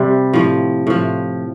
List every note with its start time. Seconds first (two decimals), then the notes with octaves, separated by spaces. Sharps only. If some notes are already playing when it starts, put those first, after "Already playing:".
Already playing: C3 G3
0.33 A2 F3
0.87 A2 F3